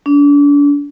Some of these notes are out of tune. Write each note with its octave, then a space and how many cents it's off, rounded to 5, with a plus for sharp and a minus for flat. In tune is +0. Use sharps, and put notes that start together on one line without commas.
D4 -35